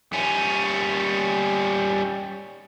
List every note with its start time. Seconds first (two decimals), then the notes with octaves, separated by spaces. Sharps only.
0.13 G3 C#4